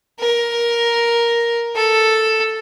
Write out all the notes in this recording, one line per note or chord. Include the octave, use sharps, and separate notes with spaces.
A#4
A4